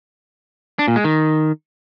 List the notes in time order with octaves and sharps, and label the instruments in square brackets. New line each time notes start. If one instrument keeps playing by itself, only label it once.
[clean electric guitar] D4
A#2
G#3
D#3